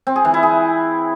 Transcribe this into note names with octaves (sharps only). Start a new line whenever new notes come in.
C4
G#4
E3
E4
G#4